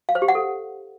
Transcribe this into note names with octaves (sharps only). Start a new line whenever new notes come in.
F5
C5
G4
F#5
A4